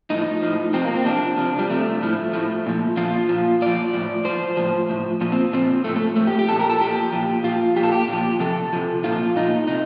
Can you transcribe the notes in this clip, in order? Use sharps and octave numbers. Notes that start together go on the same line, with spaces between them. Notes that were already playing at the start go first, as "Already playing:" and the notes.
A2 F3 D#4
A2 F3
C3 F3 C4
A#3
C4
C3 F3 D4
C3 F3
G3
C3 F3 A3
A2 F3
A2 F3
A#2 F3
A#2 F3 F4
A#2 F3
A#2 F3 D5
A2 F3
A2 F3 C5
A2 F3
A2 F3
A#2 F3
C4
A#2 F3 C4
A2 F3 A3
A3
A2 F3 A3
G4
G4
A#2 F3 A4
A#4
A4
A#2 F3 G4
A#2 F3
A#2 F3 F4
A#2 F3 G4 A4
G4
A#2 F3
C3 F3 A4
C3 F3
A#2 F3 F4
A#2 F3 D#4
C3 D#4